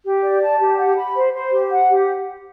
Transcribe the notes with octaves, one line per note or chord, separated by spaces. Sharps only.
G4
D5
A5
G4
F#5
B5
C5
C5
G4
F#5
G4